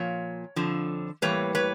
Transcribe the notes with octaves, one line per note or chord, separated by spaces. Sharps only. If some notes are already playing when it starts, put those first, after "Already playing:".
Already playing: A#2 F3 C#5
F2 D3 F3
A2 E3 G3 A#3 B4 C#5
B4 C#5